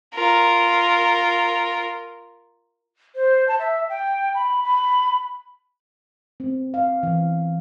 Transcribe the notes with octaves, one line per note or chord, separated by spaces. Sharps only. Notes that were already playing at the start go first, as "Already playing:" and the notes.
F4 A#4
C5
A5
E5
G5
B5
B5
C4
F5
E3